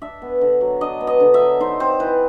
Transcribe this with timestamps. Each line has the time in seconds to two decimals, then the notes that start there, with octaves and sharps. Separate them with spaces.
0.01 D4 E5
0.22 B3
0.41 D3
0.61 F#3
0.81 D4 D#5
1.01 B3
1.07 D#5
1.20 D3
1.34 E5
1.40 F#3
1.60 D#4 C5
1.80 C4 C5
2.00 E3 B4